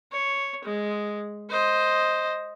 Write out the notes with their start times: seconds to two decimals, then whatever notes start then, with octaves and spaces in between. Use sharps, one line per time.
0.12 C#5
0.65 G#3
1.50 C5 D#5